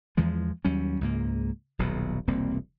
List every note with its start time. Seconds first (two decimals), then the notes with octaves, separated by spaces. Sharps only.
0.17 E2 E3 F3 G#3
0.65 D#2 F#3 G3 C#4
1.01 C#2 G#2 A#3
1.79 D#1 B1 B2
2.28 E1 C2 A#3 C4